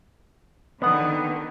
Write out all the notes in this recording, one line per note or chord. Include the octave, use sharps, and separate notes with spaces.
D3 D#3 B3 F#5